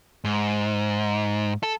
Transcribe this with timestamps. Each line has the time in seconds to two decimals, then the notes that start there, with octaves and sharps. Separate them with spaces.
0.24 G#2
1.63 A4